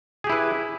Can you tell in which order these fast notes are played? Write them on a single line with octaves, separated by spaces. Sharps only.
G#4 G4 E4 B4